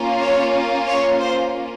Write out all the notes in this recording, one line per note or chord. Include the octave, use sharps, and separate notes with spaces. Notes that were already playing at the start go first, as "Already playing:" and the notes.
Already playing: A#3 C#4 F4
C#5
C#5
C5